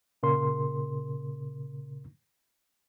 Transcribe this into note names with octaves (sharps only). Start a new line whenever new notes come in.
A#2 C#3 A#4 C6